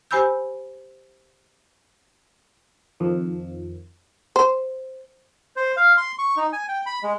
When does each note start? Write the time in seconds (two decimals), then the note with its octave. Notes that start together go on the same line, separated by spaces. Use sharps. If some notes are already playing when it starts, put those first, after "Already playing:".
0.11 G4 C5 G#5 B5 E6 G6
3.00 F2 D#3 F3
4.36 C5
5.56 C5
5.77 F5
5.97 C6
6.19 C#6
6.37 D#4
6.53 G#5
6.68 G5
6.86 B5
7.03 G#3